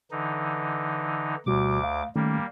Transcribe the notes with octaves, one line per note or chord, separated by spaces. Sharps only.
D3 E3 D#4
D2 B2 G3 F#4 D6
F5
D#3 G3 A3 A#3 C#4